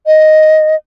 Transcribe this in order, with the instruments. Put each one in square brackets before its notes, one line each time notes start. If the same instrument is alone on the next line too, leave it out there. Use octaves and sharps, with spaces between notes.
[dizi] D#5